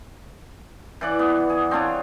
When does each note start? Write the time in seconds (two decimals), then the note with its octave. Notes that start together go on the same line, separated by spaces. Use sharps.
1.01 E3 D5 F#5
1.19 B3
1.50 G#4
1.71 C4 D4 F4 C#5